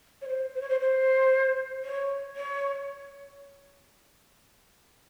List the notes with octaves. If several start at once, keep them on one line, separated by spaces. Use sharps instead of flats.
C#5
C5
C5
C#5
C5
C5
C#5
C#5